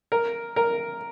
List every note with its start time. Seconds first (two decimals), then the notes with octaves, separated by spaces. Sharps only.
0.12 A#4
0.56 A#4